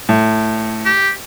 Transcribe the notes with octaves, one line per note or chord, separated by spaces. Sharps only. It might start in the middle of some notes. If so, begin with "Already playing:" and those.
A2
G4